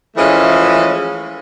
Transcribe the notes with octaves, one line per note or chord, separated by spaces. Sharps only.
E3 F3 G#3 A3 C#4